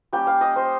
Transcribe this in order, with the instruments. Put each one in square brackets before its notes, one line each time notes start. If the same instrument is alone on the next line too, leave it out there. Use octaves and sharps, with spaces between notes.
[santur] G3 A#3 C#4 G5
F5
D#5
C5